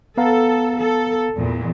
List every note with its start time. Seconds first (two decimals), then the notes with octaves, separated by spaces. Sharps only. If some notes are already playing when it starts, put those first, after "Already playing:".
0.18 B3 A4 F5 A#5
0.77 A4
1.38 E2 A#2